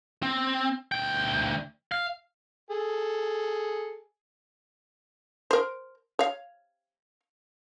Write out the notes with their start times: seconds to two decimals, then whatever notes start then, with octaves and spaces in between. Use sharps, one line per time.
0.23 C4
0.92 D2 G5
1.92 F5
2.70 G#4 A4
5.51 A#4 C5
6.19 C#5 F5